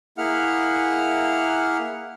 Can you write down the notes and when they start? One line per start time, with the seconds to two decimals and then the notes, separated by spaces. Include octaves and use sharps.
0.18 A#3 E4 G#4 F#5 F6